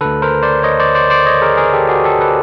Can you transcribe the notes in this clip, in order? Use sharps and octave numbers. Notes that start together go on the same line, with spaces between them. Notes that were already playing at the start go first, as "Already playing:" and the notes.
D2 D3 A4 B4
A#4 C5
C5 D5
C#5 D#5
C5 D5
C5 D5
C5 D5
C#5 D#5
G#4 A#4
G#4 A#4
G4 A4
F#4 G#4
G4 A4
A4 B4